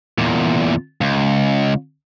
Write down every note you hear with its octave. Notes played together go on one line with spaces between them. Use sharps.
E2 A#2
C#2